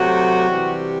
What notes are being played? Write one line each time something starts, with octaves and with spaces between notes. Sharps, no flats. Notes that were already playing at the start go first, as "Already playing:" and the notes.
Already playing: C3 F#3 A3 F#4
C3 E3 G3